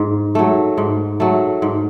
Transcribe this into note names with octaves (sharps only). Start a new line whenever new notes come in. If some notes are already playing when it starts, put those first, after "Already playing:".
Already playing: G#2
F#3 A3
G#2
F#3 A3
G#2